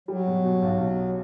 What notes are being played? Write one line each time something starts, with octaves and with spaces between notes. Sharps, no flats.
F#3 G3
B2
B2
B1
B2